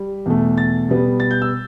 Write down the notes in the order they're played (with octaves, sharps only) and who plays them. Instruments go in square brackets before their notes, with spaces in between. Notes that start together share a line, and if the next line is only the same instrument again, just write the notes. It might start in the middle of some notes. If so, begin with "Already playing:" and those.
Already playing: [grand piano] G3
E2 B2 A3
A6
B2 G3 B3
A6
G6
E6